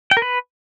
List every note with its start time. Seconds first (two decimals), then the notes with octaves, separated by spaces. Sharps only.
0.11 G5
0.17 A#4
0.22 B4